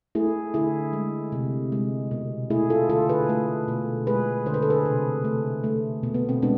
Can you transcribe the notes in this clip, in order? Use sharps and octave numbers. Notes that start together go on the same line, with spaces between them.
A3 E4 G#4
D3 E4 G#4
G#3
C3
G#3
B2
A3 E4 G#4
F4 A4
D3 F4 A4
G#4 B4
A3
B2
G#3 G#4 B4
D3 C5
B4
A4
G#4 B4
C3
A3
A3
B2
B3
C4
G#3 B3 D4